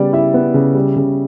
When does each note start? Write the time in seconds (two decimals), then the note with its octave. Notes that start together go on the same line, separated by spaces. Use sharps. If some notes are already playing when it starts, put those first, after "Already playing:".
Already playing: C#3 G3 B3 D5
0.13 E4 E5
0.34 B3
0.54 C#3
0.75 G3
0.96 C#3